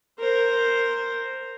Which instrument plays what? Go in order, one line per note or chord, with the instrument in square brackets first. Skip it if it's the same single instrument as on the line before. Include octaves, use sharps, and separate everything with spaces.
[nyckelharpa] A#4 C5